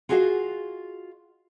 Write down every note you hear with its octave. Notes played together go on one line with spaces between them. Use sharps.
F4 F#4 G#4 C5 D#5 F5